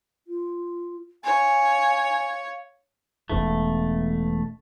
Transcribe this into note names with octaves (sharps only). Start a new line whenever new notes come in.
F4
C#5 F5 G#5
E1 B2 A3